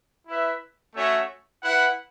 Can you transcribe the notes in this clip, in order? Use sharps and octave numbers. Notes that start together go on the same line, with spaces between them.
E4 B4 E5
A3 C#4 F#4 C#5 E5
E4 B4 F#5